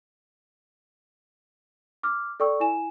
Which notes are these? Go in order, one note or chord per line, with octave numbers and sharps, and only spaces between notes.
D6 F6
A4 D5 G5 C#6 E6
E4 G#5 E7